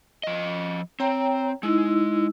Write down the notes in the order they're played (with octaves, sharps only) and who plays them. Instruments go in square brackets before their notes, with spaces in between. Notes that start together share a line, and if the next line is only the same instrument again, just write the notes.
[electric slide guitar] F3 D#5
[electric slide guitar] C4 [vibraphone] C#5 G5 A#5
[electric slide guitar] G#3 [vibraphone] D#4 E4 E6